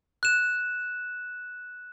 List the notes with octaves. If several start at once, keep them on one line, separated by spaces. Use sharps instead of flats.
F#6 E7